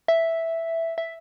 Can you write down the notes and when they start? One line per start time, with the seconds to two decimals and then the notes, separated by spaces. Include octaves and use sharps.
0.08 E5
0.98 E5